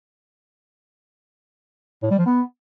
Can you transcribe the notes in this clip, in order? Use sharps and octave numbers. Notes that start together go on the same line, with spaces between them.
A2
G3
F3
B3